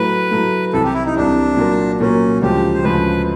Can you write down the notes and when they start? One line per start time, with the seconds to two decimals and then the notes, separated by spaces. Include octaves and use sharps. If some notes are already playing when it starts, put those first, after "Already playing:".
Already playing: A2 F#3 A3 B4
0.31 A2 F#3 A3
0.73 C2 C3 E3 A4
0.84 G4
0.94 E4
1.05 D#4
1.15 C2 C3 E3 D4
1.57 A#2 F#3 A#3
2.00 A#2 F#3 A#3 C#4
2.41 D2 C#3 F3 G#3 G4
2.74 C5
2.84 D2 C#3 F3 G#3 B4